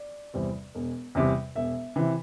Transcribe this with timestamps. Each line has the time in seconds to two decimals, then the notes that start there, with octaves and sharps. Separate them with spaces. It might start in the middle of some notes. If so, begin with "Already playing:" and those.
Already playing: D5
0.34 E2 C3 G3 C4
0.75 E1
1.15 E2 C3 G3 C4
1.56 E1 E5
1.96 C3 E3